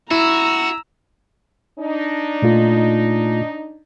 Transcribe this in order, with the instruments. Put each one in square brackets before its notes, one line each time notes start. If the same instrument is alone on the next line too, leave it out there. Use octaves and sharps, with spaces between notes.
[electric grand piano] E4 [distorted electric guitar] F#4 [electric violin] A#5 E6
[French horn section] D4 D#4
[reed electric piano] A#2 A3 F4